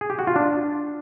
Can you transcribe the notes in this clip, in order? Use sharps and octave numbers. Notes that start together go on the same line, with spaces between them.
G#4
G4
F#4
F4
D4